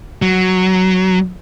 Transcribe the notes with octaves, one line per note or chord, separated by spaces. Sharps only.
F#3